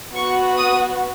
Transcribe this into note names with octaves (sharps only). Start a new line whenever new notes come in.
B3 F#4 C#6
D#6